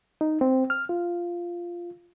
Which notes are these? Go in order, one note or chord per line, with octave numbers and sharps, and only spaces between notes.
D#4
C4
F6
F4